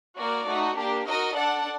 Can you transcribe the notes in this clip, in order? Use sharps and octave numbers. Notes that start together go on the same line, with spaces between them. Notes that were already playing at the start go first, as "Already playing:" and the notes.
A#3 F#4 A#4 D5
A3 D#4 F#4
A#3 D4 G4
D#4 F#4 A#4 D#5
D4 A4 D5 F#5 A5